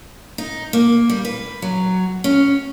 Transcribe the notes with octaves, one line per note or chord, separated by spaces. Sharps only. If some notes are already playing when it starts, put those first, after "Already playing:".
D#4
A#3
G3
B4
F#3
C#4